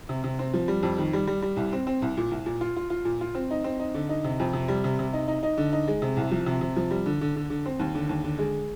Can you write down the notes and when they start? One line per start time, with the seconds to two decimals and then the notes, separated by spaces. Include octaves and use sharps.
0.09 C3
0.24 C3
0.39 C4
0.54 F3
0.68 G3
0.83 F2
0.98 D#3
1.13 G3
1.27 G3
1.42 G3
1.57 C2
1.73 C4
1.87 C4
2.02 C2
2.17 A#2
2.31 C2
2.46 A#2
2.61 F4
2.76 F4
2.90 F4
3.05 A#2
3.21 F4
3.35 C4
3.51 D#4
3.64 C4
3.79 D#4
3.94 D3
4.09 D#4
4.24 C3
4.40 F2
4.53 C3
4.68 G3
4.84 C3
4.99 C3
5.13 D#4
5.28 D#4
5.43 D#4
5.58 D3
5.72 D#4
5.88 G#3
6.02 C3
6.17 C2
6.31 F3
6.46 C3
6.61 C3
6.76 F3
6.91 G3
7.06 D3
7.21 D3
7.36 D3
7.50 D3
7.66 C4
7.80 D#2
7.95 D3
8.09 D#2
8.24 D3
8.39 G#3